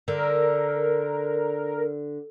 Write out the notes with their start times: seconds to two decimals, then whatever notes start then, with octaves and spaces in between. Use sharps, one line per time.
0.08 D3 A#4